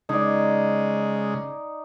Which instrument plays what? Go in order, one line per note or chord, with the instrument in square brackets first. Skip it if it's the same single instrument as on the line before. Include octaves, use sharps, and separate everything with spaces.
[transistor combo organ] C#3 G#3 [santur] D#4 D5